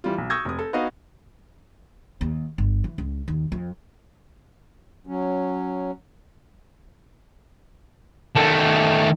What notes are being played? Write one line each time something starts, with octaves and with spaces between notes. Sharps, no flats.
E3 G3 F4
B1
C#6 D#6 E6 G6 G#6 A#6
F1 D#6
A4
B3 D#4 F#4 D#5 F5
D#2
G1
E3
C#2
D#2
F2
F#3 C#4
D#3 A3